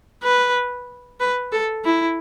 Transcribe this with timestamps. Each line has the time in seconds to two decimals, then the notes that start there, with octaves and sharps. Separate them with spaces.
0.23 B4
1.20 B4
1.52 A4
1.85 E4